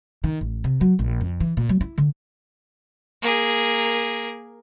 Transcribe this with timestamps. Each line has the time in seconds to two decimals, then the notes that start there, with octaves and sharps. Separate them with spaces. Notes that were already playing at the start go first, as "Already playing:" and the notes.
0.24 D#3
0.41 A1
0.64 C3
0.81 F#3
0.99 A#1
1.21 F2
1.40 E3
1.57 A#2
1.69 F#3
1.81 E4
1.98 D3
3.22 A#3 G#4